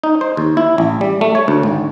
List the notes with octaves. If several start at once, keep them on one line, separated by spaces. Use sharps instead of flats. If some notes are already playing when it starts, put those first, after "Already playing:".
D#4
C5
D#2
E4
A1
G3
A3
C#5
D2
G#1